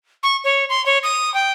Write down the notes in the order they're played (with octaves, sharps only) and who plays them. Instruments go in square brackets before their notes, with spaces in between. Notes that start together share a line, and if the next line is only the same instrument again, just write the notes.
[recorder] C#6
C#5
C6
C#5
D#6
G5